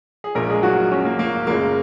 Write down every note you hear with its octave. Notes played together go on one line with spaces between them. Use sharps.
G#4
A#1 A#2 G#3 A#3 A#4
G#3 G#4
F#3 F#4
C#4
A#3
A#3
F#1 F#2 C#3 G#3 A#3